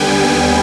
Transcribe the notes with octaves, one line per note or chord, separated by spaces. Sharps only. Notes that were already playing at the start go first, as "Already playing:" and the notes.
Already playing: D#2 D3 G3 B3 G5 G#5
G#5